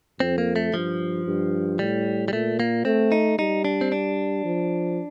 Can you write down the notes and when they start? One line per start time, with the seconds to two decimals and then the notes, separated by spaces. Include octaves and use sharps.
0.20 F2 C4
0.38 A#3
0.56 A3
0.74 G2 F3
1.26 G2
1.79 A2 G3
2.28 G3
2.32 A#2 A3
2.60 A#3
2.85 A3 C4
3.12 D#4
3.38 G3 D#4
3.65 D4
3.81 C4
3.92 D4
4.44 F3